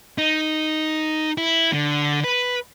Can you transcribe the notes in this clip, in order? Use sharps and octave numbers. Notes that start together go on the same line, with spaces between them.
D#4
E4
D3
B4